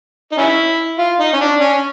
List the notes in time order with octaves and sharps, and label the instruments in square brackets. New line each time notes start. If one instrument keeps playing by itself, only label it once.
[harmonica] D#4
C#4 E4
F4
D#4
C#4
D4
C#4